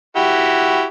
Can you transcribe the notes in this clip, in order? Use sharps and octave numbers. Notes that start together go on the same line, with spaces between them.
E4 F#4 G4